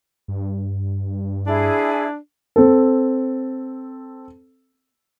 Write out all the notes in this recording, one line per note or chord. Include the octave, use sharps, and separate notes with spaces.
G2
D4 E4 G#4
C4 A4